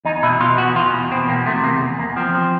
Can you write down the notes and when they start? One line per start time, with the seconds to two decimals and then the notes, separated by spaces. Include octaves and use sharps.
0.05 E2 D#4
0.23 B2 E4
0.40 B2 F4
0.58 E2 F#4
0.75 E2 F4
0.93 B2
1.11 B2 C4
1.29 E2 A#3
1.46 C3 A3
1.63 E2 A#3
1.82 E2
1.99 E2 A#3
2.16 F3 C4
2.35 F3